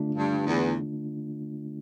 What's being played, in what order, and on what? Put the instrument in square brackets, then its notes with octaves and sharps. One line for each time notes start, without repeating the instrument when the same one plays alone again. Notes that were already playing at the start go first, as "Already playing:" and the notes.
Already playing: [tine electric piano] D3 A3 D4 F4
[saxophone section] G2
E2